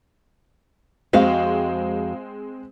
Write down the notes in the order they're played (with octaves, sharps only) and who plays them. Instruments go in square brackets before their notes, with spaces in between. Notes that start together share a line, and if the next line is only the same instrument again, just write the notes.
[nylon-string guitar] F2 F#4 F5 [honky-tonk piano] G#3 C4